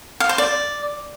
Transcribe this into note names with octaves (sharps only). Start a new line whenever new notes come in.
F5
C5
D5